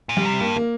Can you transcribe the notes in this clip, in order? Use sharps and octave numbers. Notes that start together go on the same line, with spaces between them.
A#2
G3
C3
G2 A#3
A#3